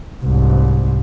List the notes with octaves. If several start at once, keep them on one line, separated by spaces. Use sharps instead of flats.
C2 G#2